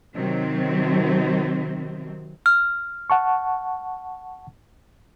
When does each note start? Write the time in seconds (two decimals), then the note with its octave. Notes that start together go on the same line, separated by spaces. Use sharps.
0.14 C3 D#3 F#3 C4
2.46 F6
3.10 F#5 A5 C#6